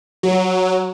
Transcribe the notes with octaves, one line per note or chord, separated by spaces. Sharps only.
F#3